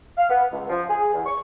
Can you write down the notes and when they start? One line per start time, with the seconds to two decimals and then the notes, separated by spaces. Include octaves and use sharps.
0.18 F5
0.29 B3
0.51 C#2
0.69 F3
0.90 G#4
1.14 E2
1.26 C#6